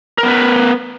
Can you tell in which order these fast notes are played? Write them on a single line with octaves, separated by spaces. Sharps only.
A#4 B3 B4